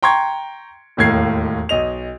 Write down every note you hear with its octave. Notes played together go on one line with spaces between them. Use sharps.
G5 A#5 C6 C#6 G#6
E1 D#2 A2 A#3 G#6 C7
B1 D#5 F7